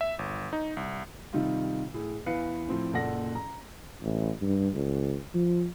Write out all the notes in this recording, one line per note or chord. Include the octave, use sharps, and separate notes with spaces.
E5
G1
D#4
C2
C3 D#3 G3 D#4 F4
A2 G#4
E2 E3 B4 F5 C#7
A2 F3 C4
F#1 A#2 A4 D5 F#5 A#6
A#5
A1
G2
C#2
F3